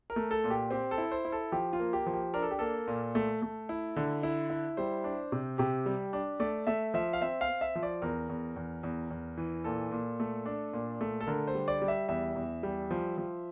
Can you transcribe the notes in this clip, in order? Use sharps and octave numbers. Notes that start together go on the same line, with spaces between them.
A#4
A3
A4
A#2
G4
C4 G4
A4
E4
C5
E4
A4
F3 G4
F4
A#3
G4
F3
G4
D4 A#4
A4
G4
A#3 A4
A#2
A3
A3
E4
D3
E4
E4
G3 C5
D4
C3
C3 G4
G3
D4
A3 D5
A3 E5
F3 E5
F5
C4 E5
F5
C4
E5
F3
D5
E2 A#4
E2
E2
E2
E2
E3
A#2 A4
A#2
A3
D4
A#2
A3
A4
D3 A#4
C5
G3
D5
G3
E5
E2 E5
E2
G3
F3
F3